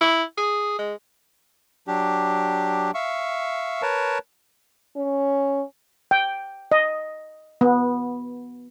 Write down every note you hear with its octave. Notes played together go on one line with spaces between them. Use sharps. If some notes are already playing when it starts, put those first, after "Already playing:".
E4
G#4
G#3
F#3 D4 G4
E5 F5 C#6
A#4 B4 C#5 A5
C#4
G5
D#5
B3